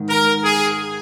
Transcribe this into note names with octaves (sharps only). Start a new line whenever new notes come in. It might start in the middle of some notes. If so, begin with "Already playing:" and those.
Already playing: G#2 D#3
A#4
G#4